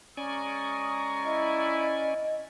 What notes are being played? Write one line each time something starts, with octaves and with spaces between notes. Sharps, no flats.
G#3 C#4 D5 G#5 A#5 C#6 D#6
E4 D#5